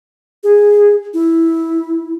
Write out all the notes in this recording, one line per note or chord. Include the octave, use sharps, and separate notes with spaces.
G#4
E4